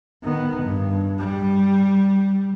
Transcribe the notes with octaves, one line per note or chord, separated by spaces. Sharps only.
D#3 B3
G2
G3